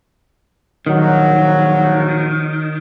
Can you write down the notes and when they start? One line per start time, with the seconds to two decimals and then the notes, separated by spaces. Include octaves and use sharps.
0.87 A#1 D#3 F#3